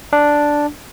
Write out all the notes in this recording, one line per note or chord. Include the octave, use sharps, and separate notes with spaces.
D4